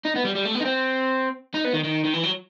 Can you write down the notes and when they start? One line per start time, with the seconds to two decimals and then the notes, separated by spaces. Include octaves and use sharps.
0.05 D#4
0.16 B3
0.25 G3
0.35 G3
0.45 A3
0.54 B3
0.60 D#4
0.65 C4
1.54 D#4
1.65 B3
1.74 D#3
1.84 D#3
2.05 D#3
2.13 E3
2.23 F#3